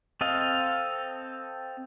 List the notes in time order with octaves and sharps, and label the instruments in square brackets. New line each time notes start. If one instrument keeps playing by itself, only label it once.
[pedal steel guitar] C4 A4 D#5 F5